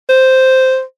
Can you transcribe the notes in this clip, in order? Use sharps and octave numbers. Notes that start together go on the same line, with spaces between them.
C5